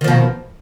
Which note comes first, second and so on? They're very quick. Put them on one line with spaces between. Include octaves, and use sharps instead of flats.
D#3 F3 B2